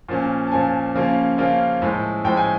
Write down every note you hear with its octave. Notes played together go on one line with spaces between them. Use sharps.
A#2 F3 A#3 C#4
A5
A#2 F3 A#3 C#4 G#5
C#3 F3 A#3 C#4 F4
C#3 F3 A#3 C#4 F4
A2 F3 G#3
A2 F3 G#3 G5
G#5